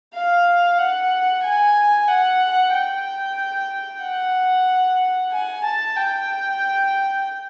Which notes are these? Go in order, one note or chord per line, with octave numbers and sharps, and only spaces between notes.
F5
F#5
G#5
F#5
G5
F#5
G#5
A5
G5